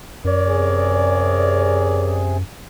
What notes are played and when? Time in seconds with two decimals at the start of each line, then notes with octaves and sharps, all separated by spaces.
0.25 F#2 A#4 C#5 D5
0.47 C3 G#4